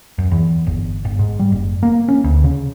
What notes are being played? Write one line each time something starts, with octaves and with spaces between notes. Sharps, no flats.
F#2
E2
G1
G1
G#2
G3
F#1
A#3
C#4
D2
C#3